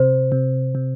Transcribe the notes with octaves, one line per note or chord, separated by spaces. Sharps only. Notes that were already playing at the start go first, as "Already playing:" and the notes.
Already playing: C3 C5
C3
C3